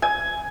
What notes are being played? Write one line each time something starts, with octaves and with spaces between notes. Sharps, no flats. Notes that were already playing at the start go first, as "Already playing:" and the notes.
G#5